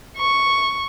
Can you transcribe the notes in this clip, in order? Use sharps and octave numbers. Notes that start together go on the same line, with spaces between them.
C#6